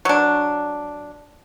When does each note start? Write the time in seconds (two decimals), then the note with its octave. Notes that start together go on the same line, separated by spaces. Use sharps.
0.05 F#3 D4